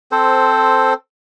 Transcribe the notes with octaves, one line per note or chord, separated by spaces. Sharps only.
C4 A4 C5